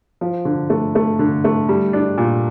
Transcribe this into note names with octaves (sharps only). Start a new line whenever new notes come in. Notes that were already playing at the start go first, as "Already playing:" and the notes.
F3
D3
A3
A3
D3
A3
G3
D4
A#2